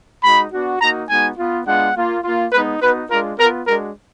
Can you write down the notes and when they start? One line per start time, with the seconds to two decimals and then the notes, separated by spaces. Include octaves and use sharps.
0.23 G#3 D#4 F#4 B5
0.52 B3 D4 F#4
0.80 A#3 D#4 F#4 A#5
1.09 G#3 B3 D#4 F#4 G#5
1.38 B3 F4
1.66 G#3 B3 D4 F4 F#5
1.95 A#3 F4
2.24 A#3 F4
2.52 G#3 B3 D#4 B4
2.81 B3 D#4 F#4 B4
3.10 G#3 D4 F4 A#4
3.38 B3 F4 A#4
3.67 G#3 D4 F#4 A#4